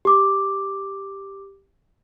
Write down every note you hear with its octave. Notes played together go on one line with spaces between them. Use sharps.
G4 D6